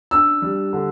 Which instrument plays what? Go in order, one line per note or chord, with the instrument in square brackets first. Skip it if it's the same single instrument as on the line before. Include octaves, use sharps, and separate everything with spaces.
[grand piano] D4 [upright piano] E6
[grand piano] G3
D3